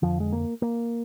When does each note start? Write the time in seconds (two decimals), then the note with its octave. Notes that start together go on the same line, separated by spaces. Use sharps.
0.02 F2 D3 F3
0.20 G#3
0.32 A#3
0.62 A#3